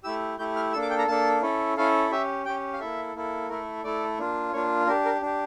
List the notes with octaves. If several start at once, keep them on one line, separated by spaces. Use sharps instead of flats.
A3 E4 G4 E6
A3 E4 G4 G6
F6
A#3 D4 A4 E6
D6
G5
A#5
A#3 D4 A4 A5
C#4 E4 A4
C#4 E4 A4 F5
C#4 G4 E5
C#4 G4 G5
F5
A#3 E4 A4 E5
A#3 E4 A4
A3 E4 A4 A#4
A3 E4 A4 D5
A#3 D4 F4
A#3 D4 F4 C#5
D4 G4 A#4
A#4
D4 G4